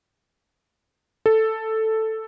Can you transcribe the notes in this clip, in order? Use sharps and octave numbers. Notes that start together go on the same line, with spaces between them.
A4